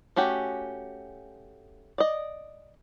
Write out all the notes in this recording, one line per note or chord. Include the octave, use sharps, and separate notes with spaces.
A3 C#4 F#4 G4
D5 D#5